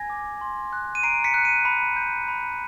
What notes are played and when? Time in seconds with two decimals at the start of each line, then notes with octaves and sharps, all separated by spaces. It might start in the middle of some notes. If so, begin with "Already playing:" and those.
Already playing: G#5 G#6 A#6
0.10 D6
0.41 C6
0.73 F#6
0.95 D#7
1.03 A#5 C7 D7
1.24 B6 C#7
1.34 F#6
1.45 C#7 D#7
1.65 B5
1.96 G6
2.28 B5